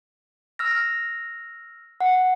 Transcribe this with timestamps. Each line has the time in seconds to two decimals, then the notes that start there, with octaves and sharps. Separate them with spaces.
0.59 E6 F6 A#6
2.01 F#5